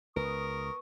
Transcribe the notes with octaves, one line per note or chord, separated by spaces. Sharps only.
C#2 A#4 B4 C#6 D#6